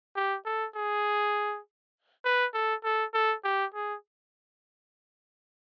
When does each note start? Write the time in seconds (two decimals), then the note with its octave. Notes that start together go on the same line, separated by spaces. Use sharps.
0.16 G4
0.45 A4
0.76 G#4
2.25 B4
2.54 A4
2.84 A4
3.14 A4
3.44 G4
3.74 G#4